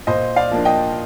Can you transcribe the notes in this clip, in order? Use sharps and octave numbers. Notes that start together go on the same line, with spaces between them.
A#2 C5 D#5
D5 F5
F3 A#3 D4
D#5 G5